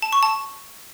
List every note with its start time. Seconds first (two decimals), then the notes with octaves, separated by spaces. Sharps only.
0.02 A5
0.13 C#6
0.23 A5